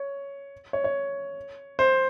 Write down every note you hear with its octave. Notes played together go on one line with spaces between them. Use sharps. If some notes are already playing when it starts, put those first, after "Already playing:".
Already playing: C#5
C#5
C#5
C5